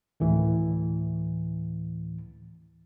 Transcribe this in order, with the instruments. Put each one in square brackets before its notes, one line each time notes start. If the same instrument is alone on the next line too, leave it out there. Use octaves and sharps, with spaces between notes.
[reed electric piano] D2 A2 E3